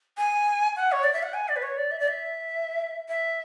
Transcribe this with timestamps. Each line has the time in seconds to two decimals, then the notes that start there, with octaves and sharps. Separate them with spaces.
0.18 G#5
0.76 F#5
0.92 C#5
1.03 D5
1.13 E5
1.23 F#5
1.34 G#5
1.48 D5
1.56 B4
1.63 C#5
1.78 D5
1.91 E5
2.00 D5
2.08 E5
3.08 E5